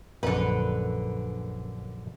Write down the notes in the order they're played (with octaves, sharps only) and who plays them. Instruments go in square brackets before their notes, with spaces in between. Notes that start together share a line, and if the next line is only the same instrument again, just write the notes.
[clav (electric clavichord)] A#1 F#2 F#5 [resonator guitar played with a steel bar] D3 B4